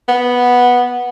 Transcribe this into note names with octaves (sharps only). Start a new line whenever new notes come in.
B3